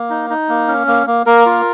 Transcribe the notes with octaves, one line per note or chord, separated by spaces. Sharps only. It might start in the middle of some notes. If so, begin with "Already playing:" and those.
Already playing: A#3
D#4
D#4
A#3
C#4
A#3
A#3
A#3 A#4
F4